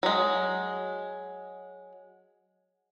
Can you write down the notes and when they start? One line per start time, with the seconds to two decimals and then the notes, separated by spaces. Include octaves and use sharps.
0.03 F#3 G#3